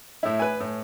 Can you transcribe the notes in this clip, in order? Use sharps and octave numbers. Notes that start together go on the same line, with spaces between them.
A2 E4
B4 G#5
A2